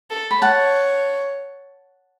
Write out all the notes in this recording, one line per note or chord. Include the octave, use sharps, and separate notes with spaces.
A4
B5
C#5 F#5 A5